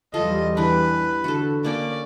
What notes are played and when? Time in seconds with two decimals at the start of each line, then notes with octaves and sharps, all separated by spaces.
0.14 E2 G3 F4 A4 D#5
0.57 E3 D4 B4
1.24 D3 F#4 A4
1.64 A#3 C#4 D5 D6